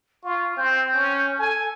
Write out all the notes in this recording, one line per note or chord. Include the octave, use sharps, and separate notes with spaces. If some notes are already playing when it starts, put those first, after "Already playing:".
F4 C#6
C4 G6
C#4
A4 G#5